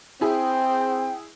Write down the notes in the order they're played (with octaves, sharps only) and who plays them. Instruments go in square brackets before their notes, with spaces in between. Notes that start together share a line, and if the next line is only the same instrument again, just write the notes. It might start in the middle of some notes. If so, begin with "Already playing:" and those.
[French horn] C4 [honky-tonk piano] E4 G#4 [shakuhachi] G5